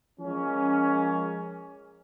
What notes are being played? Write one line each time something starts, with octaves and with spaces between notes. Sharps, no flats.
F3 G#3 A#3 C#4